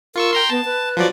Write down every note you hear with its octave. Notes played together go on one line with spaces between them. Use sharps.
F4 A#4 C#6 E6
G5 A#5 C6
B3 A5
B4
F3 F#3 D5